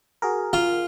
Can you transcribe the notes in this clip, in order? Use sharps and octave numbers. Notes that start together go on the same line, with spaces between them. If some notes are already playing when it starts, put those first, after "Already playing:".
F#4 G#4 A#4
F4